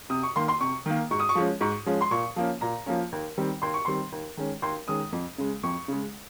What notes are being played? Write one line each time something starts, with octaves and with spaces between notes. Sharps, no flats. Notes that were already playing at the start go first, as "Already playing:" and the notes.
C3 D#6
C#6
D#3 A#3 C6
C6
C3 C#6
D#3 A#3
G#2 C#6
D#6
C#6
F3 G#3 C#4
G#2 C#6
F3 G#3 C#4
C6
A#2 C#6
F3 A#3 C#4
A#2 A#5
F3 A#3 C#4
D#2
D#3 G3 C4
D#2 C6
C#6
D#3 G3 C4 C6
D#2
D#3 G#3 C#4
D#2 C6
D#3 G#3 C#4 D#6
F2
C#3 G#3
F2 C#6
C#3 G#3